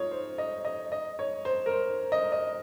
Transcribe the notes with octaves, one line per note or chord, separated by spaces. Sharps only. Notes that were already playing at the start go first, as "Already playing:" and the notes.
Already playing: D#4 F4 C#5
C5
D#5
D#5
D#5
C#5
C5
A#4
C5
D#5
D#5